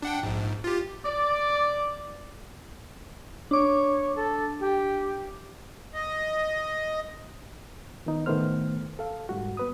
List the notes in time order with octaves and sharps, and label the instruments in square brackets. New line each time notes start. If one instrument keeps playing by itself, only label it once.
[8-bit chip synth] D4 F#5 G5
A#1 G#2
F4 G4
[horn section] D5
[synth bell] D4 D6 [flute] C#5
[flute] A4
G4
[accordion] D#5
[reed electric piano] D#3 B3 D#4
A2 D#3 A3 B3 C5 F6
A4 F5
D2 G#2 G3 F#4
B3 B4 D#6